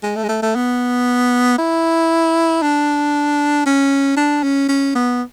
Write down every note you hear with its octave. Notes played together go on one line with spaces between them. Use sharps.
G#3
A3
G#3
A3
A3
B3
E4
D4
C#4
D4
C#4
C#4
B3